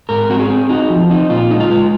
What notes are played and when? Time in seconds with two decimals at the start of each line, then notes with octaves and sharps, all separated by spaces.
0.09 G#2 A#4
0.30 C4 F#4
0.40 G#4
0.50 C4
0.69 D#4 F#4
0.90 F3
1.10 C4 D#4
1.30 A#2 F4
1.51 G#3 D#4
1.60 F4
1.70 G#3